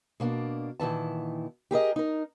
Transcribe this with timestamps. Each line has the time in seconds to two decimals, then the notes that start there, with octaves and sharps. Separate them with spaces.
0.20 B2 A#3 D4
0.80 A#2 D#3 E3 A5
1.71 G4 G#4 A#4 D#5
1.96 D#4 A#4